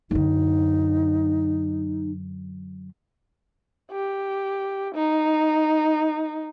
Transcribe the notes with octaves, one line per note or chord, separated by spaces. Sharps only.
F#2 D3 D#4
G4
D#4